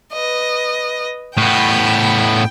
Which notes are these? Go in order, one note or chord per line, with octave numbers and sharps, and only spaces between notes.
B4 D#5
A2 B3 G5